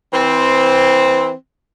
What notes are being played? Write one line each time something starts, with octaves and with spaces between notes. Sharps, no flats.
E3 C4